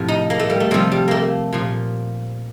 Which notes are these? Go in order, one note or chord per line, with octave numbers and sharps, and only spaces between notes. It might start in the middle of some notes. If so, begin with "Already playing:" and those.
Already playing: A2 C3 F3
D#4
A#3
A3
G3
A3
C3 F3 G3
G3
A3 A#3
A#2 F3